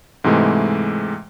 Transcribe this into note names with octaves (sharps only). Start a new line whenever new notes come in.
G#2 C3 E3 G#3 A3